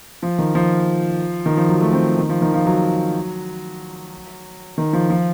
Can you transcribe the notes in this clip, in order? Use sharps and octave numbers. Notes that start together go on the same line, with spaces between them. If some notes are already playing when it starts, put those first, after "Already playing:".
F3
D#3
F3
D#3
F3
F#3
A3
C4
D#3
F3
D#3
F3
F#3
D#3
F3
F3